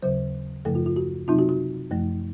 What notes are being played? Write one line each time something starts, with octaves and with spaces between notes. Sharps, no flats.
D#2 C#3 F#3 C5
F#2 C#3 F3 A3 A4
F4
F4
F#4
C3 F#3 C4 D#4 F4
F#4
F#4
F#2 F3 A3